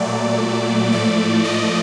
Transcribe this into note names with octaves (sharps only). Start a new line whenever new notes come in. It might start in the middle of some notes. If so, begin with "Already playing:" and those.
Already playing: A#2 F#3 A3 D5
A2 F3 A3 D5
D#5